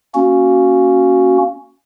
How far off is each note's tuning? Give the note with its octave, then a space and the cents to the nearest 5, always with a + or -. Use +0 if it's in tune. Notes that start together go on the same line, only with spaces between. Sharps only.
A#3 +0 C#4 +0 F#4 +0